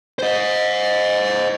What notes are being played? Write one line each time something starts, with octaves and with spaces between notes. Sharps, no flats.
C5 D#5